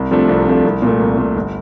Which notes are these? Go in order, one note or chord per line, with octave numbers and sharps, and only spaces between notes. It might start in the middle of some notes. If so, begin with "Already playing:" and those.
Already playing: C2
C3 F3 A3 D4
C2
C3 F3 A3 D4
C2
A#2 A3
C2
A#2 A3
G1